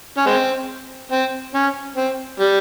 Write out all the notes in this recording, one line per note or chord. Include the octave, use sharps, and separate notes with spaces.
C#4
G#3 C4
C4
C#4
C4
G3